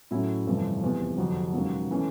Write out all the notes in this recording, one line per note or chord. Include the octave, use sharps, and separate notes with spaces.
A2 F#3 A3 C#4 E4
G1 F2 C3 E3 A3
F1 E2 C3
F1 F2 D3 F#3
E1 D#2 C#3 F#3
E3 A3 C#4